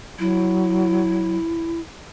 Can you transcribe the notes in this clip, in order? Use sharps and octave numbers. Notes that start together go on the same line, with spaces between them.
F#3 E4